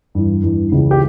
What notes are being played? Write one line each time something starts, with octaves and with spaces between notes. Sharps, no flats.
G2 E3
G2 E3
C#2 C#3 E3
G4